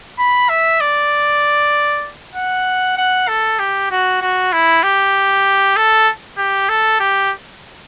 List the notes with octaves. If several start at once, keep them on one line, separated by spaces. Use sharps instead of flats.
B5
E5
D5
F#5
F#5
A4
G4
F#4
F#4
E4
G4
A4
G4
A4
G4